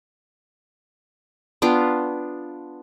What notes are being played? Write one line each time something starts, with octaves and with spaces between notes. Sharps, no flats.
B3 D4 F4 G5